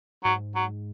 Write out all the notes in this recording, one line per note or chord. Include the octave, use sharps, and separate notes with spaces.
G#2 F#3
F#3